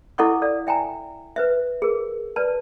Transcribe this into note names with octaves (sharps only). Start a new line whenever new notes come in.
E4 A4 D#5 F#5 C#6 D6
A4 D5 F5
E5 G5 G#5 A#5
B4 C5 E5
G#4 A#4
B4 D5 A5